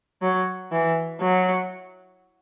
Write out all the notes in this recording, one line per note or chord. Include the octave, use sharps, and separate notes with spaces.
F#3
E3
F#3